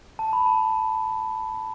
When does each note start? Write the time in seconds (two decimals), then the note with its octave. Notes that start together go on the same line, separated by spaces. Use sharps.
0.19 A5
0.33 B5
0.46 A5